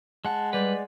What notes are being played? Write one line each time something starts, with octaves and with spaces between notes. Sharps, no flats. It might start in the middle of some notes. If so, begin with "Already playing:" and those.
G#3 F#5 A5
G3 B4 D5